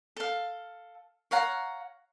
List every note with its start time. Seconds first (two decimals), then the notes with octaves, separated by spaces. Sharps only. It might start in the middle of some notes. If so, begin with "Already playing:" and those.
0.16 A4 F5
1.31 C#5 F5 F#5 A#5